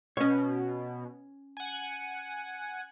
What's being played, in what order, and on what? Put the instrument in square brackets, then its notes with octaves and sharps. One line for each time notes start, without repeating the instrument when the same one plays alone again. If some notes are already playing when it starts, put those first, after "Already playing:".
[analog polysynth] B2 [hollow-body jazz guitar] C#4 C#5
[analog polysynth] F#5 G#5